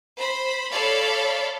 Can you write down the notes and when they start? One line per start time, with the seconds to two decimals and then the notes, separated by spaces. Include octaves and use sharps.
0.17 C5 B5
0.72 A4 C#5 D5 F5 B5